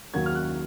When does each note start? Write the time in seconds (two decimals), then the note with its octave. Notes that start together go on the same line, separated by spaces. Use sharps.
0.14 D#2 D#3 F#3 G#6
0.26 F6
0.35 F#6